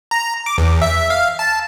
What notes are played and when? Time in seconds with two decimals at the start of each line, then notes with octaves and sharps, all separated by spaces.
0.11 A#5
0.46 D6
0.58 E2
0.82 E5
1.10 F5
1.39 A5